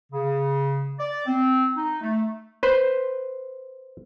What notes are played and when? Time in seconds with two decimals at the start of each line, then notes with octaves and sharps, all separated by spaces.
0.12 C#3
0.99 D5
1.26 C4
1.76 D#4
2.01 A3
2.63 B4 C5